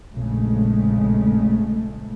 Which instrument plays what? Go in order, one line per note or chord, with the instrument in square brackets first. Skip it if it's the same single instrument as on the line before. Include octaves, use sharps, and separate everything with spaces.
[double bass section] A#1 F2 C#3 G#3 A3